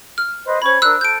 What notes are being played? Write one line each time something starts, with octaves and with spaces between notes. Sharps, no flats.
F6
B4 C5 D#5
C#4 C5 C#5 B5 G#6
D4 A#4 E6 F#6
A4 G6 D7